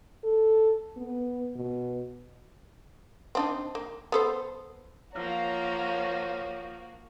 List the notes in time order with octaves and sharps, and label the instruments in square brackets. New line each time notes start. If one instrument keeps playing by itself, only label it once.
[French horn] A4
B3
B2
[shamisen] C4 D4 D#4
A#3
B3 A4 C5
[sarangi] F3 [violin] A#3 F#4 [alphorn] C#5 [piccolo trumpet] A#5